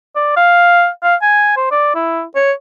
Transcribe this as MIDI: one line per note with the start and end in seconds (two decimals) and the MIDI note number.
0.15 0.36 74
0.37 0.88 77
1.03 1.15 77
1.22 1.54 80
1.57 1.68 72
1.71 1.94 74
1.95 2.23 64
2.36 2.52 73